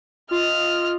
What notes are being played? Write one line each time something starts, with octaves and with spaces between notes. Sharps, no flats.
F4 D#5 F6